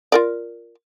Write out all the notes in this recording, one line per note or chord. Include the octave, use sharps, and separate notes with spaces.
F4 A#4 D5